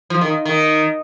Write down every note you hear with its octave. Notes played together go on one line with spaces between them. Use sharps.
F3
D#3
D#3